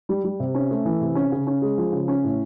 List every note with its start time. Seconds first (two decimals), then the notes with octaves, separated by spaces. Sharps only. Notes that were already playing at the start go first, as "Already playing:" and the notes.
0.09 G3
0.24 G3
0.40 C3
0.55 C#4
0.70 A3
0.85 E3
1.01 C3
1.15 C#4
1.32 C#3
1.47 C#4
1.61 G#3
1.78 F3
1.93 C#3
2.08 C#4
2.23 A2